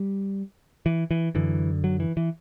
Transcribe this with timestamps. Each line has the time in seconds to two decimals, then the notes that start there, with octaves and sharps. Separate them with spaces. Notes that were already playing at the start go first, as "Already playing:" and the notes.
Already playing: G3
0.86 E3
1.11 E3
1.35 F#2 D3 E3
1.84 F#3
2.00 E3
2.17 E3